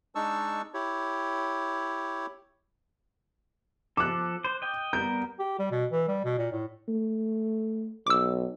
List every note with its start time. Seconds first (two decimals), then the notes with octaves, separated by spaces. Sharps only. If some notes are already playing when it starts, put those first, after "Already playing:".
0.15 G#3 D4 D#4 A5 C#6 E6
0.74 E4 G4 C#5
3.97 F3 A4 D6 F#6
4.44 C5
4.62 D#5 G5
4.93 G3 B3 A#4 G6
5.39 G4
5.59 G3
5.71 B2
5.91 E3
6.08 G3
6.25 B2
6.38 A#2
6.52 A2
6.88 A3
8.07 B1 D6 E6